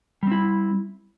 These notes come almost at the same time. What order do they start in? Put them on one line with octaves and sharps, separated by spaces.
G3 C4 E4